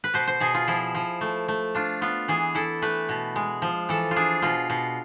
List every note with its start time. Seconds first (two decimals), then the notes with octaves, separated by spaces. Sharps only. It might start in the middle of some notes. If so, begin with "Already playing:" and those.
0.04 B4
0.14 B2 C5
0.27 C5
0.40 B2 G#4
0.54 F4
0.67 F3 E4
0.95 F3
1.21 A3
1.48 A3
1.75 D4 F4
2.02 B3 F4
2.28 E3 G#4
2.55 E4 A4
2.82 A3 B4
3.09 B2
3.36 G#3
3.62 F3
3.89 E3 A4
4.11 F4
4.16 D4 G#4
4.42 B2 F4
4.70 B2